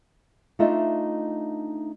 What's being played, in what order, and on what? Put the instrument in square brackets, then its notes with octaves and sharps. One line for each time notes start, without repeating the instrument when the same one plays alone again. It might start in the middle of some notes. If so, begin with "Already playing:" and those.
[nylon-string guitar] A3 D4 D#4 F4 D#5 E5